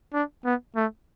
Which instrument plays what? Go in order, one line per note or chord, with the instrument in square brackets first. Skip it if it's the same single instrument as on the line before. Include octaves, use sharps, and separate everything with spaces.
[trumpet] D4
B3
A3